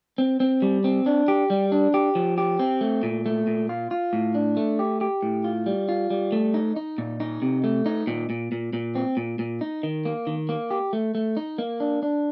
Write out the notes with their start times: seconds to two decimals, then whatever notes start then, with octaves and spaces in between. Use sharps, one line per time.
0.18 C4
0.40 C4
0.62 G3
0.84 C4
1.06 D4
1.28 G4
1.50 G3
1.72 D4
1.94 G4
2.15 F3
2.38 G4
2.59 C4
2.81 A3
3.03 A#2
3.26 A3
3.47 A#2
3.69 F4
3.91 F4
4.13 A2
4.35 D4
4.57 A3
4.79 G4
5.01 G4
5.23 A2
5.44 F4
5.66 G3
5.89 F4
6.10 G3
6.32 A3
6.54 D#4
6.76 D#4
6.98 A#2
7.20 D#4
7.42 C3
7.64 A3
7.86 D#4
8.07 A#2
8.30 A#2
8.52 A#2
8.73 A#2
8.95 C4
9.17 A#2
9.39 A#2
9.61 D#4
9.83 D#3
10.05 A#3
10.27 D#3
10.49 A#3
10.71 G4
10.93 A3
11.15 A3
11.37 D#4
11.58 A#3
11.80 D4
12.03 D4